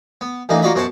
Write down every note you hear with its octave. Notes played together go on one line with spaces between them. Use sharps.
B3
A1 D2 E3 A#3 D#4
A#3 F4 F#4 D5 D#5 B5
F#2 B2 F#4 C5 F#5 A5